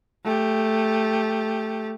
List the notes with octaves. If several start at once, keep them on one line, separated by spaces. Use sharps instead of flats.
A3 G4